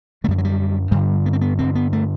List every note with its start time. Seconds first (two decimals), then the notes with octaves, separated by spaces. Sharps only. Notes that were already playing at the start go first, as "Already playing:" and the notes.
0.24 D3 A3
0.28 F#2 G3
0.38 F#3
0.45 G3
0.91 G2 D3 G3
1.26 B3
1.33 C4
1.41 B3
1.59 G2 D3 C4
1.75 B3
1.93 A3